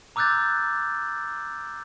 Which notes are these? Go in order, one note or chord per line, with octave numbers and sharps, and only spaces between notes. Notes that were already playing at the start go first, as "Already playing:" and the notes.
A#5 D6 E6 F#6 G6 A6